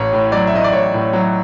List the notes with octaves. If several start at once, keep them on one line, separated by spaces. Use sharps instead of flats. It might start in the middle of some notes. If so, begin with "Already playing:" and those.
Already playing: A1 C#5
A2
F#3 D5
E5
A1 D#5
D5
A1 C#5
A2
F#3